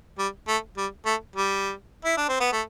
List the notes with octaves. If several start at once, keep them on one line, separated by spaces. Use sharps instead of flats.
G3
A3
G3
A3
G3
E4
D4
C4
B3
A3